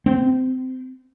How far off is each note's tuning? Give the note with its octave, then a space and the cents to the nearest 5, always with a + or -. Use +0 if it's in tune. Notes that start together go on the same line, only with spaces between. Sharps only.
C4 -25